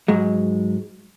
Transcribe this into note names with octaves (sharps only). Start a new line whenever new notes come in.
G#2 F#3 G#3